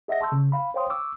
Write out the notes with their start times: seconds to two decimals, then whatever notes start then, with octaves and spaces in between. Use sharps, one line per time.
0.08 G#4 D#5 E5 F#5 A#6
0.21 A5 C6 C#6 E6 G6
0.32 C#3
0.52 F5 B5
0.74 C5 C#5 F5 G5 C6 D#6
0.90 C#6 D6 E6